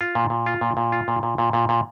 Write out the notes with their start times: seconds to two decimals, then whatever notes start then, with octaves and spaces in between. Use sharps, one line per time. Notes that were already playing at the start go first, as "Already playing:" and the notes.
0.01 F4
0.15 A#2
0.30 A#2
0.46 F4
0.61 A#2
0.77 A#2
0.92 F4
1.08 A#2
1.23 A#2
1.38 A#2
1.53 A#2
1.69 A#2